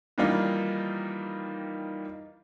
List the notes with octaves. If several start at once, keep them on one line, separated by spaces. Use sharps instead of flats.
D#3 E3 G3 A#3 D#4 F4